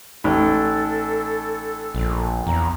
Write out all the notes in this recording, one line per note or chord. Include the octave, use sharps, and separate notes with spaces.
A1 D#4 A4
A#1
E2 A#5